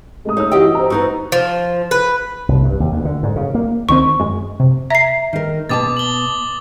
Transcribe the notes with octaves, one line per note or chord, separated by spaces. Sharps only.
G#3 A3 D#6
D#4 C#5 E6
E3 F#4 G4 D#5 G5
C5 A#5
B3 D#4 F#4
F3
B4
C2
G2
D#2
D2
D3
G#2
C#3
A#3
D2 D#3 C4 C#6
F#2 G#3
C3
E5 A#5 C7
D#3 A#4
B2 G#5 A5 D6 D#6 A6
F#7 G7